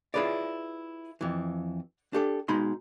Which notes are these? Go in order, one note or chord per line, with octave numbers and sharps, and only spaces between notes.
E4 F4 G#4 B4 C#5 D5
F2 E3
D4 G4 A4
B2 G#3 D#4 B5 C6